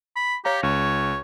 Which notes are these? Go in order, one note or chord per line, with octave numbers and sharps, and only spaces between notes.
B5
G4 C#5 F5 A#5
C#2 C#5